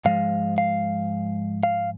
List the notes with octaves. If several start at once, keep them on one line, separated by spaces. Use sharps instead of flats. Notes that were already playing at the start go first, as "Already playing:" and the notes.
G#2 F3 G#3 F5
F5
F5